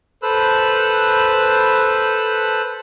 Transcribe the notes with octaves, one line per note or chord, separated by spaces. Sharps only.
A4 B4 C5 B5 E6 F#6